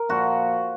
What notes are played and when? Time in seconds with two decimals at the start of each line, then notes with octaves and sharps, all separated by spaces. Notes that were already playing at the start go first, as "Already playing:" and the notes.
Already playing: A#4
0.09 A#2 F3 F#4